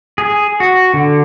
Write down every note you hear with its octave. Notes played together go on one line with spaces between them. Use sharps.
G#4
F#4
D3